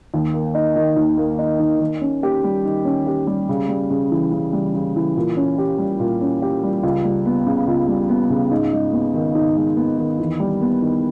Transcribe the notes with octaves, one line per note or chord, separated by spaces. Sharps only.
D#2
A#3
D#4
D#3
D#2
A#3
D#4
D#3
D#3
C#4
G4
G3
D#3
C#4
G4
G3
C#3
G3
C#3
E3
C#3
G3
C#3
E3
A#2
C#4
G4
G3
A#2
C#4
G4
G3
C#2
G3
B3
C#3
C#2
G3
B3
C#3
G#2
G#3
B3
D#3
G#2
G#3
B3
D#3
E2
G3
B3
D#3